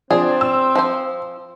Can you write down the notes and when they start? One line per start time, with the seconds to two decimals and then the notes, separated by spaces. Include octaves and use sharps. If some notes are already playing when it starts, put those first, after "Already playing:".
0.11 F3 C4 D4 G#4
0.41 E6
0.75 F3 C5